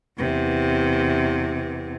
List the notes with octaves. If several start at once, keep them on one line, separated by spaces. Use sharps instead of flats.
E2 C3